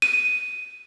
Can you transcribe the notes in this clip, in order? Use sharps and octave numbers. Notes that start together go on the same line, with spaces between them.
D#7